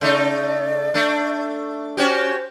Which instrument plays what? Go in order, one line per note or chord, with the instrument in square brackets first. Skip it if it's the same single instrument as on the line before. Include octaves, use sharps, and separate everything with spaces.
[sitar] C#3 A3 D#4 [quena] D5
[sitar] A3 D4
[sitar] C#4 F#4 G4 [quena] C5